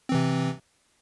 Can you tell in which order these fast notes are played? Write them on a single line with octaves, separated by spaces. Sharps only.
C4 E3 C3